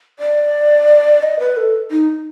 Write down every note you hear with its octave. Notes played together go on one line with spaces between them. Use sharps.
D5
D#5
B4
A4
D#4